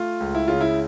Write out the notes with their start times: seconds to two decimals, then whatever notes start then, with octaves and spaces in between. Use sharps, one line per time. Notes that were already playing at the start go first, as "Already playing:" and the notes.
Already playing: A3 F4
0.20 C#2
0.35 E4
0.48 C#3 F4
0.61 E4